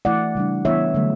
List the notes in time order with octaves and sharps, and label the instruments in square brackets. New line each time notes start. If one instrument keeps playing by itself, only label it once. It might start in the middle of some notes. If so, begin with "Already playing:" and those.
[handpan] E3 A3 E4 D5 F#5
C#3 G3 D4
E3 B3 E4 C#5 E5
D3 F#3 A3